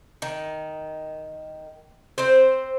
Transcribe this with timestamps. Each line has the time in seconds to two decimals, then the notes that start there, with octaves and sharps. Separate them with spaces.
0.22 D#3
2.18 C4 C5